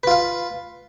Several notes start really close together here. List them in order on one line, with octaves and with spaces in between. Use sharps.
B4 F4 F5